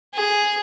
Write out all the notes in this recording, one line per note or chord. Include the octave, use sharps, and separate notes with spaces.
G#4